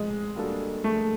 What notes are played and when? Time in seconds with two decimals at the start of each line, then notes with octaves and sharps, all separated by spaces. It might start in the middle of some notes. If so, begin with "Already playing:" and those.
Already playing: F3 G#3 A3 C4
0.35 G3 A#3 D4 F#4 A4
0.84 A3